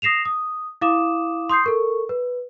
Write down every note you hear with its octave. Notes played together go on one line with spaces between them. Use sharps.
D#6 A#6 C7 E7 F7
D#6
E4 F5 D6 D#6 E7
C6 D#6 G6 C7
A4 A#4 C#6
B4